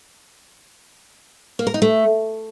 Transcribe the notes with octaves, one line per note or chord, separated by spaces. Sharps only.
A#3
A#4
D#4
A3